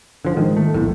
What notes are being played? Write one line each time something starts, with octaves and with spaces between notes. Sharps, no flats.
D3 F3
G#2 D#3
A3
A#1 E2 A2